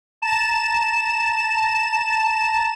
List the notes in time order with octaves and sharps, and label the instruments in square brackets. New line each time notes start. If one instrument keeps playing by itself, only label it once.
[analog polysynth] A5 A#5 E7